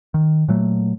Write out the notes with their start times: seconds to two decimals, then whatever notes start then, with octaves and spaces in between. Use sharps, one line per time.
0.14 D#3
0.48 A#2 F#3 A3